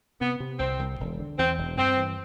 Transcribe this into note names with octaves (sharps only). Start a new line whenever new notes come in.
C3 B3
C3
C2 C4
C2
E1
D3
E2 C4
E1
G2 C4
E3